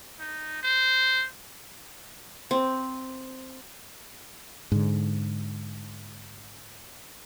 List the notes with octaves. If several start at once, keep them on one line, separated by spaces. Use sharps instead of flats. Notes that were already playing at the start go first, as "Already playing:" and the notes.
D#4
C5
C4
G#2 D3